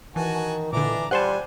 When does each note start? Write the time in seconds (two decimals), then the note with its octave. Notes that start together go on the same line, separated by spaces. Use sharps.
0.16 D#3 E3 F#4 G#5 A5
0.73 A#2 D3 E3 D4 A#5 D6
1.11 G3 C5 F#5 G#5 A5 C6 F#6